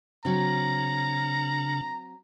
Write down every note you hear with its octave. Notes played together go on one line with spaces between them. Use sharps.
C#3 F#3 C4 D4 A#5